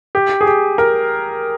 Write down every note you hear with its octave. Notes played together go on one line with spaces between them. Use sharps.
G4
G#4
G4
A#4